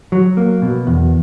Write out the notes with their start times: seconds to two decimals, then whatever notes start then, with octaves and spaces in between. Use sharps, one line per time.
0.12 F#3
0.37 A#3
0.62 B2
0.87 E2